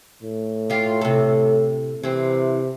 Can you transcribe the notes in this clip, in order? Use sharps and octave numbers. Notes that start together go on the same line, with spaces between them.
A2
F4 G4
C3 A4
C3 E3 C4